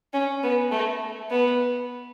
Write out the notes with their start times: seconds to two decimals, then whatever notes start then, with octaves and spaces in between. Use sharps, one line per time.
0.13 C#4
0.43 B3
0.71 A3
1.31 B3